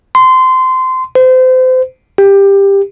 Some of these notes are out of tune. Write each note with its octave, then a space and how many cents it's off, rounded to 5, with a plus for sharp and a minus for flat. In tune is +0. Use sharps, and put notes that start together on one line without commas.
C6 -20
C5 -30
G4 +15